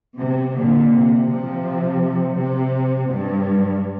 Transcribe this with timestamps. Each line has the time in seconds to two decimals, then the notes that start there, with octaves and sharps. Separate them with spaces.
0.18 C3
0.54 A#2 D3
0.91 C3
1.27 C3 F3
2.36 C3
3.09 G2